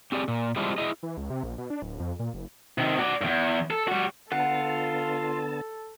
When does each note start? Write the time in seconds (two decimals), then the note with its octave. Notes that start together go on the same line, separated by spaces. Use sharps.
0.12 C4 G4 G#4 D5
0.28 A#2
0.56 G3 G#3 C4 D4 E4 F4
0.78 E4 G#4 D#5
1.03 E3
1.17 C#2
1.30 C3
1.43 A#1
1.58 B2
1.70 D4
1.82 D1
2.00 F2
2.19 A#2
2.34 F#1
2.78 C3 D#3
2.99 F#4 D5
3.21 E2 G2
3.70 A4
3.88 G3 F#4
4.32 D3 B3 F4 A4 F#5 A5